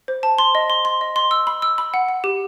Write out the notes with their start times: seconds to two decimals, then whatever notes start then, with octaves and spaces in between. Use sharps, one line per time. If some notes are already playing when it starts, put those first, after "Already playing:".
0.08 C5
0.23 A5
0.38 C6
0.55 D#5
0.70 C6
0.85 C6
1.01 D#5
1.16 C6
1.31 E6
1.47 B5
1.62 E6
1.78 B5
1.94 F#5
2.09 F#5
2.24 G4